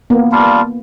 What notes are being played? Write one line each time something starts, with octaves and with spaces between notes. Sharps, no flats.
A#3 B3
G3 D4 F4